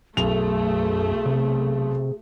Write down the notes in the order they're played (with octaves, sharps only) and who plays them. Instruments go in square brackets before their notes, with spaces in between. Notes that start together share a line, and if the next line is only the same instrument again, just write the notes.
[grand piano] B1 F7 [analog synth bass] F#2 [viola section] A3 [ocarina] G#4
[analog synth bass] C3